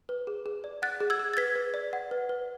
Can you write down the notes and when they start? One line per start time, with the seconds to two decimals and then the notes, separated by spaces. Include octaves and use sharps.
0.09 B4
0.27 G#4
0.46 G#4
0.64 D5
0.82 F#5 F#6 A6
1.00 G#4
1.10 E6 G#6
1.19 G#4
1.34 A6
1.37 B4 G#6 B6
1.55 B4
1.74 D5
1.93 F#5
2.11 B4
2.29 B4